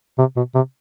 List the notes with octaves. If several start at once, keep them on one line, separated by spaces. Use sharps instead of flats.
C3
B2
C3